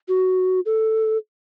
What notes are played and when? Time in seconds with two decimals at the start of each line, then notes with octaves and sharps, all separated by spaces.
0.09 F#4
0.66 A4